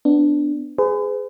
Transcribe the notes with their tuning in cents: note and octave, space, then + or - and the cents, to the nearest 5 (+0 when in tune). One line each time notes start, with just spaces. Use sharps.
B3 +20 D4 +0
G#4 +0 B4 +45